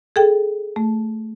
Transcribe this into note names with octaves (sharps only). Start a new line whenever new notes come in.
G#4 A4 G5
A3